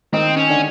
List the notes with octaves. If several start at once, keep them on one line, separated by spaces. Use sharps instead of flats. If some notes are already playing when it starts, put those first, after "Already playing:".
D#3 C4 D#4
C#4
D3 D4